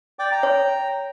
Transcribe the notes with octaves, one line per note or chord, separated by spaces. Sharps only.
D5 G5 D6
G5 A#5
C#5